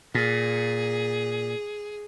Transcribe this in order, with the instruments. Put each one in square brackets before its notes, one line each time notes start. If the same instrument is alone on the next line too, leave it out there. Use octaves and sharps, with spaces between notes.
[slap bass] A#2 [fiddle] G#4